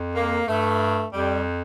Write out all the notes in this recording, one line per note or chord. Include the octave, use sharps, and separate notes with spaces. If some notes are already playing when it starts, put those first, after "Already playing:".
Already playing: F2
A#3
G2 A3
F2 G3